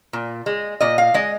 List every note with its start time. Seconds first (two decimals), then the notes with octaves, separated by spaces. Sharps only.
0.13 A#2
0.46 G#3
0.80 A#2 D#5
0.98 F5
1.14 G#3 D#5